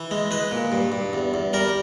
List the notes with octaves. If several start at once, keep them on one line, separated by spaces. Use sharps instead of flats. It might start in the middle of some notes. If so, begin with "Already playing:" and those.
Already playing: E3
G#3
G#3 B4
A#2
G2
G2
E2
E2
G3 A#4